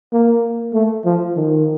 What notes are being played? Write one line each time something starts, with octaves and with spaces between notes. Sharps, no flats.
A#3
A3
F3
D#3